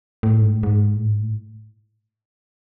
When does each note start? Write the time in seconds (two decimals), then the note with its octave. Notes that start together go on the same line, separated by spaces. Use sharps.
0.23 A2
0.41 G#2
0.52 A2
0.63 G#2
0.96 A2
1.09 G#2
1.20 A2